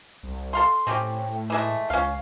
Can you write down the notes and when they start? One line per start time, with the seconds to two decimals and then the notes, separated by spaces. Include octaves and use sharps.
0.23 C2
0.53 A4 F5 C6
0.87 A2 C4 C#4 G4
1.50 E3 G#3 A3
1.90 C#2 C#4 F5